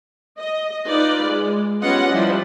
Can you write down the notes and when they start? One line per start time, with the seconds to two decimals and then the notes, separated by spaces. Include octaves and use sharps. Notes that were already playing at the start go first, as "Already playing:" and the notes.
0.38 D#5
0.86 D#4 F4 B4 D5
1.24 G#3
1.81 G3 B3 C#4 F4 D#5 F#5
2.12 F3 G3 E4